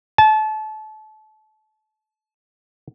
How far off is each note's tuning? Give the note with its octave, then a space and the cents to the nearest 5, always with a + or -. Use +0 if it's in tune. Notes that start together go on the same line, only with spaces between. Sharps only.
A5 -30